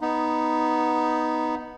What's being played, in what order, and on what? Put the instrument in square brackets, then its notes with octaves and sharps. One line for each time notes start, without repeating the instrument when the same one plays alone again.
[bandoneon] B3 D#4